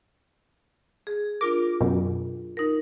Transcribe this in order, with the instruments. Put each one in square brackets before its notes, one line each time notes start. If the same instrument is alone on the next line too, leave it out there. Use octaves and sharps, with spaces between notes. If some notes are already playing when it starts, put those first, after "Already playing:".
[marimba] G#4
[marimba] D4 F4 A#4 [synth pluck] D6
[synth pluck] F#2 B2
[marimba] D#4 A#4